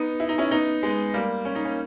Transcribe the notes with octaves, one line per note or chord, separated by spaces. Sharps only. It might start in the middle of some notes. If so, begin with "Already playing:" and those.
Already playing: B3 D#4
E4
D#4
C#4 E4
B3 D#4
G#3 B3
G3 A#3
C#4
D#4
A#3 C#4